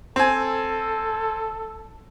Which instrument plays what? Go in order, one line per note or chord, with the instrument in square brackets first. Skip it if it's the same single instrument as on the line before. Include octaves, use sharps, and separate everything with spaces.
[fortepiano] C4 G#5 [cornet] A4